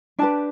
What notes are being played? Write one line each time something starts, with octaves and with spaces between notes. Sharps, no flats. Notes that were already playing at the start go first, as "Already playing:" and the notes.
D4 G4 B4 A5